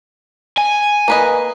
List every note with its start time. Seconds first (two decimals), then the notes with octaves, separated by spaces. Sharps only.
0.58 G#5
1.08 A#3 B4 D#5